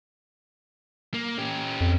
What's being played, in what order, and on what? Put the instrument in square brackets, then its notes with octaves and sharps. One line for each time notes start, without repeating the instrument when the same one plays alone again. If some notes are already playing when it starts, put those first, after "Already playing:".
[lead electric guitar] A#3
C#4 G4
[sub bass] F2